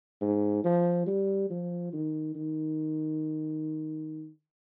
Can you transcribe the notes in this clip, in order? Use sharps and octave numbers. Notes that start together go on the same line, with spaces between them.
G#2
F3
G3
F3
D#3
D#3